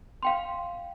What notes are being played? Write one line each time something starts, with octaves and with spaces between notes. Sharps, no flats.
F5 G5 C6